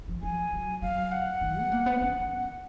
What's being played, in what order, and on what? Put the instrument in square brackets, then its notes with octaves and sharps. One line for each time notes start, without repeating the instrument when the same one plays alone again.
[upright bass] F3
[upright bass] F3 [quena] G#5
[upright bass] F#3
[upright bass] F#3 [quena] F5
[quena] F#5
[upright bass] D#3
B3
A#3
B3
C#4
B3